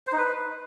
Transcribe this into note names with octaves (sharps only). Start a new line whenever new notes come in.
C5
D#4
B4